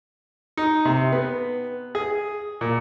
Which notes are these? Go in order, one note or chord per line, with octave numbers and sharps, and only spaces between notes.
D#4
C3
B3
G#4
A#2